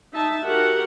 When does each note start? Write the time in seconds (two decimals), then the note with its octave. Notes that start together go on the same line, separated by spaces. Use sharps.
0.13 D#4 E5 A5
0.44 F#4 G4 A#4 F#5